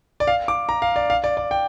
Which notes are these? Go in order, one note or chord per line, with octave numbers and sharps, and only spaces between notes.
D5
F5
D6
A#5
F5
D5
F5
D5
D5
G5